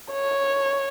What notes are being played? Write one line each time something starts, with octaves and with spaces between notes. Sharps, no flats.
C#5